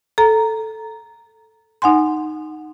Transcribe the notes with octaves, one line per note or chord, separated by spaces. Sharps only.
A4 A#5
D#4 F#5 G#5 C6